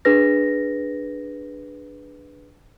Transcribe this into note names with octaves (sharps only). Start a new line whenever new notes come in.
D4 G#4 B4 A#6